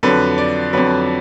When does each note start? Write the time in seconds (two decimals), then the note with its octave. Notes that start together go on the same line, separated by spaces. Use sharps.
0.03 F2 D3 F#3 B4
0.38 D5
0.73 F2 D3 F#3 B4